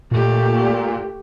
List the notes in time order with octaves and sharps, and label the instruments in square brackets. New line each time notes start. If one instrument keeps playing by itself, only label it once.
[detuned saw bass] A#2 [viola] A3 G4